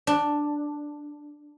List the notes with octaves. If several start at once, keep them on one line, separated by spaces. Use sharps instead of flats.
D4